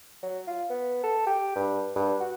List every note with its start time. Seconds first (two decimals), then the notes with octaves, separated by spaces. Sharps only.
0.23 F#3
0.48 F4
0.70 B3
1.04 A4
1.27 G4
1.55 G2
1.96 G2
2.20 F#4